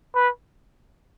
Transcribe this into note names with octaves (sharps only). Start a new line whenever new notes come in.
B4